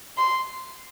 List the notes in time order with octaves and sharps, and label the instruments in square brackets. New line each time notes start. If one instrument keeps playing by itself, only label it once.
[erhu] C6